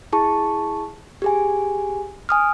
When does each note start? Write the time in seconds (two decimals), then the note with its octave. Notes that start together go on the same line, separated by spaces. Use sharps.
0.12 E4 G#4 A5 C#6
1.22 G4 G#4 G#5
2.29 G#5 D#6 F6